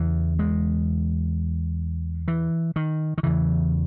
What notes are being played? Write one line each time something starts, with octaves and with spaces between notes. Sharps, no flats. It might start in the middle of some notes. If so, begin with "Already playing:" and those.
Already playing: E2 C#3 E3
G#3
E3
D#3
D#3
E2 C#3 E3